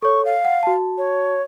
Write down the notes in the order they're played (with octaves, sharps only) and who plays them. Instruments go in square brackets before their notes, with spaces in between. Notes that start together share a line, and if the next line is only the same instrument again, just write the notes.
[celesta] A4 C#5 [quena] C#6
[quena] F5
[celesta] F#5
F#4 A5
[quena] C#5